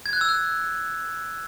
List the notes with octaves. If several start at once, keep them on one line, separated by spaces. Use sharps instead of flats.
G#6
F#6
E6
F#6